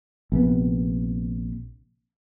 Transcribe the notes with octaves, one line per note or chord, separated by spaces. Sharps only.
A#1 C3 B3